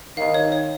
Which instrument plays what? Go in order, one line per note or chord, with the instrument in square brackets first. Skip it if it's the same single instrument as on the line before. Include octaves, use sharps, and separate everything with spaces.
[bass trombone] D#3 [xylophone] F5
[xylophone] C#5
C#5